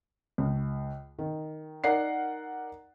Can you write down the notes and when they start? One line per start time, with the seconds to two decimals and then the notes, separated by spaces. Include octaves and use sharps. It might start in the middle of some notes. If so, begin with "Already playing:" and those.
0.38 C#2
1.19 D#3
1.84 D#4 A#4 D5 F#5 C7